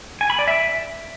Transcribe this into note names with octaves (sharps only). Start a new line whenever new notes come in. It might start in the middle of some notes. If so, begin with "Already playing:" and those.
G#5
B5
D5
E5